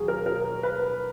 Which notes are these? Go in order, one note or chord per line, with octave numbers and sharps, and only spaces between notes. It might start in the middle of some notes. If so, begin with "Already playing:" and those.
Already playing: D#2 F#3 G#4
A#4
A#4
B4